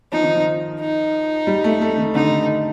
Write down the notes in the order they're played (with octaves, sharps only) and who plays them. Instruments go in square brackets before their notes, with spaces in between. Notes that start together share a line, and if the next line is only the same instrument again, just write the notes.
[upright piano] F3 [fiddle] D#4
[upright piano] D#3
F3
[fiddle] D#4
[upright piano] G3
A3
A3
D#3
[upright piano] D3 [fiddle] D#4